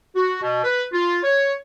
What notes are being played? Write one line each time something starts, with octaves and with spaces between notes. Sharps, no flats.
F#4
B2
B4
F4
C#5